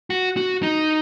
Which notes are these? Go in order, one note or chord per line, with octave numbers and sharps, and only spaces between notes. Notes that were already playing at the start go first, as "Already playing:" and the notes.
F#4
F#4
D#4